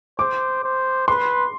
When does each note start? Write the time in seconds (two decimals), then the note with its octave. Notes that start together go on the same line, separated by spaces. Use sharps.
0.19 C5 D6
0.64 C5
1.08 B4 C6